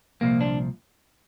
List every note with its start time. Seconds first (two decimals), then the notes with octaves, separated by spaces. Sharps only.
0.21 C2 A#2 F3 A#3
0.41 D4